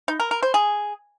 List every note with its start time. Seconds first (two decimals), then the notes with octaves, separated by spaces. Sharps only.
0.08 D#4
0.20 A#4
0.31 A#4
0.43 C5
0.54 G#4